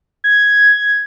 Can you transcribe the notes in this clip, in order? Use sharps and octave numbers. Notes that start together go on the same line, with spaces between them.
G#6